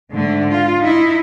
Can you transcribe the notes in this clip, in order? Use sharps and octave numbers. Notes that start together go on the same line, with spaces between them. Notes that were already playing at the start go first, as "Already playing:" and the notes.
G#2 D3 A3
F4
D#4 E4